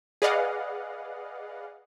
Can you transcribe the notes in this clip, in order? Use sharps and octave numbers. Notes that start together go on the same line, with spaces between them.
G#4 B4 D5 D#5 F5 F#5